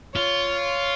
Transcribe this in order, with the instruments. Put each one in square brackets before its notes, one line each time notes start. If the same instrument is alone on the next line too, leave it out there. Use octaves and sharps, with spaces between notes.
[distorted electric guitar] F4 [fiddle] C#5